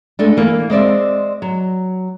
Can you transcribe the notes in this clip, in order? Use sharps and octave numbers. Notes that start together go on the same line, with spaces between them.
G#3 A3 D4
E3 A#3
G#3 C4 D5 E5
F#3